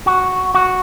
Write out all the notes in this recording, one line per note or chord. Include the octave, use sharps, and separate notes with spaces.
F#4
F#4